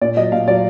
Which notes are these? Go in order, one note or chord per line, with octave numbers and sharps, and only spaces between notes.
A#2 D5
F#3 D#5
A#2 F5
F#3 D5